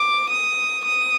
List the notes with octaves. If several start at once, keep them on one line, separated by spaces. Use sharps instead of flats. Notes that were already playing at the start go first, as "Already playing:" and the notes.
Already playing: D6
D#6
D#6